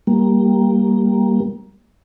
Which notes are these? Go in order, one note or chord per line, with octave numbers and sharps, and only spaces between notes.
G3 A#3